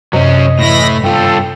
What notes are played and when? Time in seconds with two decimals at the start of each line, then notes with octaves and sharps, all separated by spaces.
0.13 F#2 C3 F#3 C#4 D#5
0.59 A2 E3 E4 B5 A#6
1.04 G2 F4 A4 G5